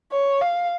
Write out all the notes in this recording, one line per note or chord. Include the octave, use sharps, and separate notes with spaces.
C#5
F5